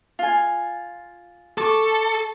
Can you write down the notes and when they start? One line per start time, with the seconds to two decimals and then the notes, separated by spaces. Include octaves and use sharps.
0.19 F4 G#5
1.58 A4 C#6 D6